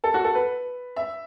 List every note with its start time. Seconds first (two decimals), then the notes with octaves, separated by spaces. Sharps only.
0.04 A4
0.14 F#4
0.24 A4
0.35 B4
0.96 E5